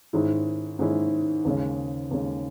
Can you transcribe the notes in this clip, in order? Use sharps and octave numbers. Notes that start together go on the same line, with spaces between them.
G#2 D#3 G#3 C#4 E4
G#2 D#3 G#3 C#4 E4
D#2 C#3 G#3 C#4
D#2 C#3 G#3 C#4